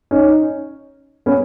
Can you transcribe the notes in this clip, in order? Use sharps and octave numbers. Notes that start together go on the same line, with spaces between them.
C#4 D#4
B3 C#4